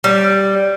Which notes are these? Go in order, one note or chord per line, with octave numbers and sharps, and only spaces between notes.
G3